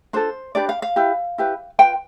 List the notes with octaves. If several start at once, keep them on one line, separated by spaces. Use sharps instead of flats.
D4 F4 A4 C5
D4 G4 B4 D5
F5
F5
E4 G4 B4
E4 G4 B4
F4 B4 G5